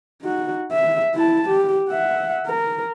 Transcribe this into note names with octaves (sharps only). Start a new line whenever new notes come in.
D#4 F#4
E5
E4 A5
G4
E5 F#5
A#4